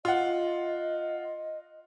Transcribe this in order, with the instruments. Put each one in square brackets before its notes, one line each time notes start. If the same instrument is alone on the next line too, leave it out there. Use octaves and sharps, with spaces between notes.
[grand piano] F4 F#5 [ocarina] D#5